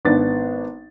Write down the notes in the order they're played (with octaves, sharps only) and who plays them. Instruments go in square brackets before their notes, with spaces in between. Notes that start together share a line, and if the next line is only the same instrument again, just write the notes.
[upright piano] G#1 B3 D4 A6